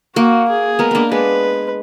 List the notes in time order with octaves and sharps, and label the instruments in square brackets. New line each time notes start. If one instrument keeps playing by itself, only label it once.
[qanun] A#3 [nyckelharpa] F#4
[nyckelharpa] G#4
[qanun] G#3 B3 [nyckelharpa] A#4
[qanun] A#3 B3 D4
[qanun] G#3 B3 [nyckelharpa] B4